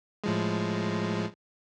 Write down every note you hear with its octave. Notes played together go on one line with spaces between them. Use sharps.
A2 F3 G#3